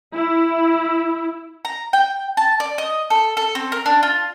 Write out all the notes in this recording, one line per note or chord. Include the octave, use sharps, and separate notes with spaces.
E4
A#5
G5
A5
D5
D#5
A4
A4
C4
A#4
D4
F4